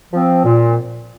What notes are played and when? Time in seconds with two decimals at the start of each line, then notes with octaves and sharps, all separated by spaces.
0.13 F3 C4
0.45 A#2